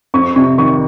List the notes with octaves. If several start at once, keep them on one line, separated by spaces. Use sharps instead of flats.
F2 C#6
C3 C#6
D#3 C#6